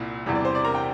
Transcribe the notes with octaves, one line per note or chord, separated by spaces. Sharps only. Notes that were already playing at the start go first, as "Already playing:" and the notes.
Already playing: C2 A#2 E4
E2 C3 E3 G3
D5
C5
D5
A#4 A#5
G5